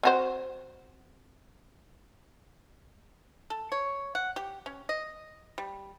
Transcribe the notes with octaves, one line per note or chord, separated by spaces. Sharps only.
C4 F#4 C5
A4
C#5
F#5
G4
C#4
D#5
G3